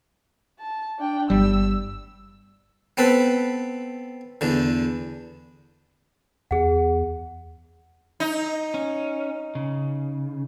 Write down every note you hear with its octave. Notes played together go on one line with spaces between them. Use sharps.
A5
D4 G5
G1 G3 E6
B3 C4 A4 B4
E2 D3
E2 G#4 F#5
D#4
C#4
C#3